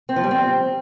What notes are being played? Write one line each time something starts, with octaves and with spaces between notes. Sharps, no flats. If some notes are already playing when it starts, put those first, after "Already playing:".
C4
F3
G3
C4